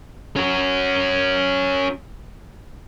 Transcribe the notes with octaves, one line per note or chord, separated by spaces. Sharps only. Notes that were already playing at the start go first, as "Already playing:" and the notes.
C#4 F#4